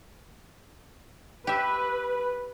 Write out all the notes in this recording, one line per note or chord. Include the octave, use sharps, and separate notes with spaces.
G4 B4 E5